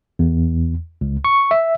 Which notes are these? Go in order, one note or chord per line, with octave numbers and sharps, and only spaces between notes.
E2
C#2
C#6
E5